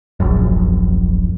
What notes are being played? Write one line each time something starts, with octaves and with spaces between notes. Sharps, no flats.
D#1 A#1 F#2